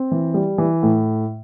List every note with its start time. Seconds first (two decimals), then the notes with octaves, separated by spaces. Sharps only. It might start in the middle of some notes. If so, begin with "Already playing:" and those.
Already playing: C4
0.11 E3
0.34 G3
0.58 E3
0.83 A2